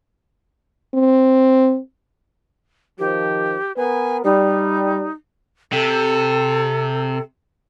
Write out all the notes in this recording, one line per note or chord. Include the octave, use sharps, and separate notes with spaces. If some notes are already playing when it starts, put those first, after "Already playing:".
C4
D#3 F3 G4
B3 A#4 B4 G#5
G3 D#4
C3 A4